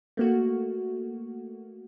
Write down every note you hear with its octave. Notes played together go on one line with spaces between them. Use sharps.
A3 A#3 F#4